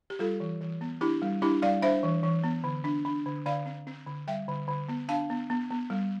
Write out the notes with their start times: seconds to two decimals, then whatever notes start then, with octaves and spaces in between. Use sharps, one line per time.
0.10 G4
0.19 G3 F4 A4
0.40 E3
0.61 E3
0.81 B3
1.01 D4 E4 G4
1.22 G3
1.42 D4 E4 G4
1.62 G3 D5 F5
1.82 D4 C5 E5
2.03 E3
2.23 E3
2.44 B3
2.64 D3
2.84 D4
3.05 D4
3.26 D3
3.46 D3 D5 F5
3.66 C4
3.87 C4
4.07 D3
4.28 G3 E5 G5
4.48 D3
4.68 D3
4.89 B3
5.08 D4 F5 A5
5.30 B3
5.50 B3
5.70 B3
5.90 G3